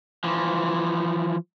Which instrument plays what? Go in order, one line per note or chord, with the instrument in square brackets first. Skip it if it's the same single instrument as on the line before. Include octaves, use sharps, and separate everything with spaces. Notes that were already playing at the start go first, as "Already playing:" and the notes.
[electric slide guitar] E3 F3